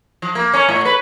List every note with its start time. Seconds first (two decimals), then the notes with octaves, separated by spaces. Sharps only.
0.22 F3
0.35 A#3
0.54 C#4
0.69 A2
0.85 B4